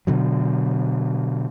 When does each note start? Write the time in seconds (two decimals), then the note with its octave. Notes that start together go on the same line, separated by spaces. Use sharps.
0.07 B2 D3 F#3